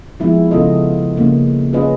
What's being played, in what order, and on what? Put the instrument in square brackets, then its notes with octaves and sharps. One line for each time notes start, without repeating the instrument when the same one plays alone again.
[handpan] F3 G#3 B3 E4 G#4
C#3 B3 F4 A4 D#5
C#3 A#3
C#4 F4 G#4 B4 D#5